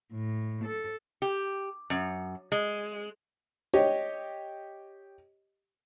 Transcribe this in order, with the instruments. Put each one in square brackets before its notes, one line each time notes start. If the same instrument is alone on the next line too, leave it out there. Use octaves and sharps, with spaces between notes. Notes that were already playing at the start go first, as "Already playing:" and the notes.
[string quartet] A2
A4
[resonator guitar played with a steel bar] G4
F#2
G#3
[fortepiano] G4 C#5 D#5